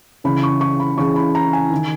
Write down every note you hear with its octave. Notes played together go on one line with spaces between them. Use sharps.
C#2 C#3 E3 B5
C#6
C#6
B5
C#2 C#3 E3 C#6
B5
A#5
G#5
D#3